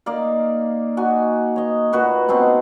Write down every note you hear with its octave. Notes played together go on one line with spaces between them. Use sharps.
A#3 D#4 D5 F5
D#4 F#4 G#5
C#5 D#5
A#2 F#4 B4 C#6
B2 C4 D#4 A5